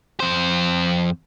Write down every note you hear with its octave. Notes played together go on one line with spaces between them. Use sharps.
F2 C5